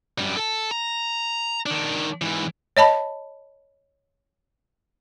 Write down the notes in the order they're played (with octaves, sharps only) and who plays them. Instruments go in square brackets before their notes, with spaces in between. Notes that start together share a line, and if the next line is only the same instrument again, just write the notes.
[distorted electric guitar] F#2 G3
A4 A5
A#5
D#3 D4
G#2 E3
[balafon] C#5 D#5 A5 B5